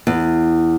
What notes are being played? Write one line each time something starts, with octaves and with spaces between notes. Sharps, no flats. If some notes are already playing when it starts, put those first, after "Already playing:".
E2